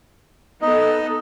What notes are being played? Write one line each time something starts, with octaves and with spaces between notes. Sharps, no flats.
B3 D#4 A4 D#5